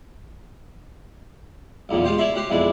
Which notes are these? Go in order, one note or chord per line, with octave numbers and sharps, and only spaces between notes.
B1 E2 A#2 C#3
G#3 F4 G4 C5
E4 C#5 D5 E5 B5 C6
C#4 F#4 G4 C6
B1 F2 G#3 D4 E4